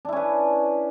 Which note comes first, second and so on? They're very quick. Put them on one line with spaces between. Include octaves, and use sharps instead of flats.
D4 E4 C#4 B4